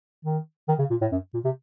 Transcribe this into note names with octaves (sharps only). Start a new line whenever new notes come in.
D#3
D#3
C#3
A#2
A2
F#2
A#2
C3